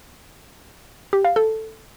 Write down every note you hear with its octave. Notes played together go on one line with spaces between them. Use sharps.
G4
F5
A4